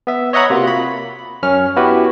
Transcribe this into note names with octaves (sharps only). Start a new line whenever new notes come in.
B3 E5
C#5 D#5 E5 F#5 A#5 B5
C3 A#3 F4 F#4
B5
F#2 C#4 F6
B3 E4 F#4 G4 B4